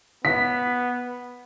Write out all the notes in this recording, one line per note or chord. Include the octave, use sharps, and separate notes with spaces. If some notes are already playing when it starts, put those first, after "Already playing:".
B3 B6